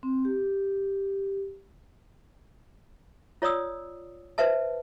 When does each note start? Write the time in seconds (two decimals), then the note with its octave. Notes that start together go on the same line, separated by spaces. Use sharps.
0.03 C4
0.25 G4
3.42 F4 C#5 D5 D#6 E6
4.38 B4 C5 E5 A5